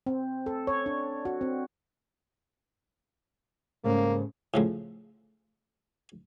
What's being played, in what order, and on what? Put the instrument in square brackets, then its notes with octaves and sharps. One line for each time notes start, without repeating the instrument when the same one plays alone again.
[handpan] C4
A4
C#5
D4
F#4
C4
[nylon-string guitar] G#2 C#3 A3 [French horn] A#3
[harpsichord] A2 C#3 F3